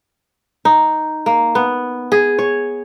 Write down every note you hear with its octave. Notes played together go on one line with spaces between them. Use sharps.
D#4
A#3
B3
G#4
C#5